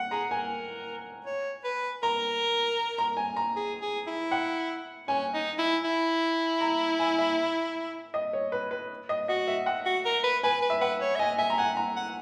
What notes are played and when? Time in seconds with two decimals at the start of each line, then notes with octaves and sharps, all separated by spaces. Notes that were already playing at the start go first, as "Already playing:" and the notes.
Already playing: F#5
0.11 G#4 A#5
0.30 A#4 G#5
1.26 C#5
1.64 B4
2.03 A#4 A#5
2.98 A#5
3.17 G#5
3.36 A#5
3.56 G#4
3.82 G#4
4.07 E4
4.32 F#5
5.08 C#4 G#5
5.34 D#4
5.59 E4
5.84 E4
6.61 A#5
6.99 G#5
7.19 E5
8.14 D#5
8.33 C#5
8.52 B4
8.71 B4
9.09 D#5
9.28 F#4 D#5
9.48 E5
9.66 F#5
9.86 F#4
10.05 A#4
10.24 B4
10.43 B4 G#5
10.62 B4
10.70 E5
10.81 B4 F#5
11.01 C#5
11.16 E5
11.19 D#5 G#5
11.38 E5 G#5
11.50 A#5
11.58 F#5 G#5
11.77 A#5
11.96 F#5